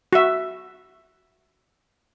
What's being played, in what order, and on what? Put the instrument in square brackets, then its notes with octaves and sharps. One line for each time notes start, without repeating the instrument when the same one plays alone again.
[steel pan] F#4 E5